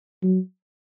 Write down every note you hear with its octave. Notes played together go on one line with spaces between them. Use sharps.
F#3